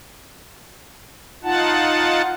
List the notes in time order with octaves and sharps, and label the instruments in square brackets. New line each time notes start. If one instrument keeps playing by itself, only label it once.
[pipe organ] D#4 F4 F#5 A5